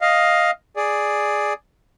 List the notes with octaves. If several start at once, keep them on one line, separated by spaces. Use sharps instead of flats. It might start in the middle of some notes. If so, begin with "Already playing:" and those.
D#5 F5
G#4 D5